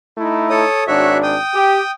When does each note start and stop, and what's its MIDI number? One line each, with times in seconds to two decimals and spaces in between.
0.18 0.64 57
0.18 0.64 63
0.18 0.64 64
0.50 0.84 69
0.50 0.84 73
0.50 0.84 87
0.87 1.35 32
0.87 1.35 62
0.87 1.17 66
0.87 1.17 73
0.87 1.17 76
1.23 1.91 79
1.23 1.91 87
1.54 1.79 67